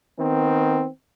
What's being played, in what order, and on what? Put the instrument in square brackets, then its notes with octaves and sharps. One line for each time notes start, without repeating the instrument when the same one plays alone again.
[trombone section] D#3 B3 C4